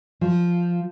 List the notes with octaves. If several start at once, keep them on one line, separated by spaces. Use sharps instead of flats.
F3